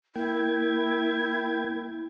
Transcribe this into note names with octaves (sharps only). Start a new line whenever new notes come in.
A#3 E4 G5 G#6